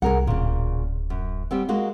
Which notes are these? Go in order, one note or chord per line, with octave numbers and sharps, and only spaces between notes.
C2 G#4 A#4 F#5
D1 A#2 C#3
F#2
G3 B3 C4
G#3 A#3 F#4